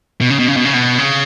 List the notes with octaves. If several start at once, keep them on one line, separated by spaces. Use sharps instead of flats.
B2
C#3
B2
C#3
B2
C#3
B2
C#3